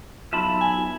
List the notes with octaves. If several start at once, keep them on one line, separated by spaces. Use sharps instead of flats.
B1 F4 E5 A5 B5
G#5